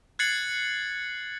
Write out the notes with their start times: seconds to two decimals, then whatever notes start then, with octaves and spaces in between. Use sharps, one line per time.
0.19 F#6 G#6 A6 C7 C#7 F#7